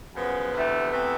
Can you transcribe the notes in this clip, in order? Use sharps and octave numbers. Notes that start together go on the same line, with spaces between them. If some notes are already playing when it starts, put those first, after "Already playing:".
F#2 C#3 F3 B3
D2 C3 E3 A3
C3 E3 A3